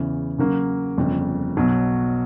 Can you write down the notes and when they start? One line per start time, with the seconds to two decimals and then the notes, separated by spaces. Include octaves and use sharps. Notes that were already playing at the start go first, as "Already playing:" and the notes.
Already playing: E2 C#3 E3
0.38 C#3 F#3 A#3 C#4
0.97 G1 F2 C#3
1.57 B1 B2 F#3